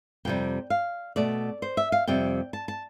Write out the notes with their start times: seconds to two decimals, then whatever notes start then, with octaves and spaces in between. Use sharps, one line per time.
0.25 F2 C3 G3 G5
0.70 F5
1.16 B2 A3 D5
1.62 C5
1.77 E5
1.92 F5
2.07 F2 C3 G3 G5
2.53 A5
2.68 A5